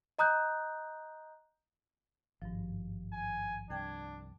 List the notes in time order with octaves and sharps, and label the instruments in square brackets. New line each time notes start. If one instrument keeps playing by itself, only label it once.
[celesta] D#5 A#5 D#6 F#6 G6
[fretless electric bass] G#1 [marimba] G2 F3
[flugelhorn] G#5
[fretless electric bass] C2 [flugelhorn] D4 [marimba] G5 G#6